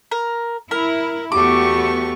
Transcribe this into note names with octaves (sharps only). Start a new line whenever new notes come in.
A#4
E4 A#4
E2 A3 B3 F#4 G4 C#6 D6